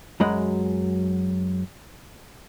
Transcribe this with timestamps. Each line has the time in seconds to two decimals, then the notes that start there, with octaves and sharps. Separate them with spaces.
0.20 F#2 F#3 G#3 D#5 B5